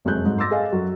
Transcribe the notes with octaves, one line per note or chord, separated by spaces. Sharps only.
F1 F#2 G#3 A3 F#6 G6
G#2
C6 D6 E6 A6 A#6
G#4 A4 D#5 F5 G#5
F#2 F#3